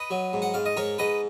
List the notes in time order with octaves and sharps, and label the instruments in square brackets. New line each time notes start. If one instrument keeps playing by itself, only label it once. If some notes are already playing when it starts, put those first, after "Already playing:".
Already playing: [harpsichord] B4 D#5
F#3
G#2
F#5
G#2 F5
D#5
G#2 A#4 C#5
G#2 B4 D#5